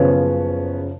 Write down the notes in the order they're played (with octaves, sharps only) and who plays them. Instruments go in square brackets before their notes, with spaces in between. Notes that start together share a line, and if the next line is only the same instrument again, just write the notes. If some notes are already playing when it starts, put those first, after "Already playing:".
Already playing: [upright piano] F#1 F#2 C#3 F3 B3 C#4